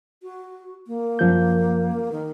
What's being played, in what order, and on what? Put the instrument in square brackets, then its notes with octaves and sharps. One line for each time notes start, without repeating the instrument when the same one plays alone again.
[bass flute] F#4
A#3
[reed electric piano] F#2 F3 G6
[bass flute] D#3